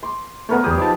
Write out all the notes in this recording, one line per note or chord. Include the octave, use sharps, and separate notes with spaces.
C6 D6
A3 B3 A#4 B4 C#5
E2 G4 G#4 B5 D#6
F3 D#4 A5 D6